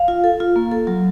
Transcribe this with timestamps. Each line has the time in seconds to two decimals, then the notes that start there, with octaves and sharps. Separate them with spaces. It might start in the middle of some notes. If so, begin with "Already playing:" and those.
Already playing: F5
0.08 F4
0.24 A4
0.40 F4
0.56 A#3
0.71 A4
0.87 F#3